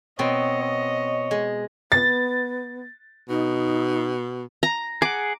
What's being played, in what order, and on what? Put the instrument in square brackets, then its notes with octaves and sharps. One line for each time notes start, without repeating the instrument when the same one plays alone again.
[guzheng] B2 C4 [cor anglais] C#5 [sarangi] D#5
[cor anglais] C#5
[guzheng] G#3
[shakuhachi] B3 [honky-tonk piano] A6
[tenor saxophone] B2 [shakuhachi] D#4
[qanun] A#5
[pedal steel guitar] G#4 F#5 [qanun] D6